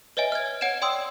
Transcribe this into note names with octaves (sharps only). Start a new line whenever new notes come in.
B4 C#5 D#5 E5 G#5
F6 G#6
C#5 F#5 G#6 D7 E7
D5 G5 C6 D#6 E6